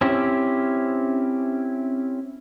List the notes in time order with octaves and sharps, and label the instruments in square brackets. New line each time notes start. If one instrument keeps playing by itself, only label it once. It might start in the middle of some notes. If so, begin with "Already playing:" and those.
[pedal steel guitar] C4 C#4 E4 G4